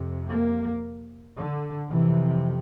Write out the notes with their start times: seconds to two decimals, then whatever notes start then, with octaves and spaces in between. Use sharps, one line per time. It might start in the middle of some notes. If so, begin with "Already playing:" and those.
Already playing: F2 C3
0.28 A#3
1.37 D3
1.91 F2 C3 E3